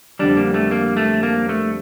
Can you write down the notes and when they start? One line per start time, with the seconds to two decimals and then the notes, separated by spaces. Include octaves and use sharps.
0.19 F2 D3 G3 D4
0.37 A#3
0.54 A3
0.71 A#3
0.97 A3
1.23 A#3
1.49 A3